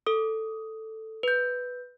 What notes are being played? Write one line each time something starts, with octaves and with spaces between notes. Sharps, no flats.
A4 D#6
B4 G6